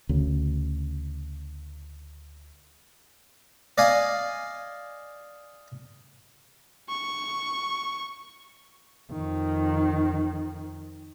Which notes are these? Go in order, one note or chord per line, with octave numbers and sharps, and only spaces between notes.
D2 C#3
D5 D#5 F5 G#5
C#6
F2 D#3